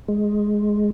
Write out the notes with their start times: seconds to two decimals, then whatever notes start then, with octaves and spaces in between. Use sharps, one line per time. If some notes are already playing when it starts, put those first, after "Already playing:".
0.08 G#3